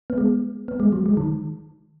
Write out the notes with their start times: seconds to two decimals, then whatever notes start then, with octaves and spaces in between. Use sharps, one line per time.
0.10 B3
0.18 G#3
0.68 B3
0.80 G#3
0.92 F#3
1.06 G#3
1.17 D#3